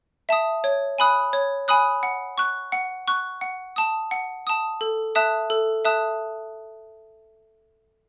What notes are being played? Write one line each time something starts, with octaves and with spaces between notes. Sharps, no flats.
E5 A5 D#6
C#5
G#5 B5 D#6 F#6
C#5
G#5 B5 D#6 F#6
F#5
C#6 F#6
F#5
C#6 F#6
F#5
A5 D#6
F#5
A5 D#6
A4
E5 A5 D#6 F#6
A4
E5 A5 D#6 F#6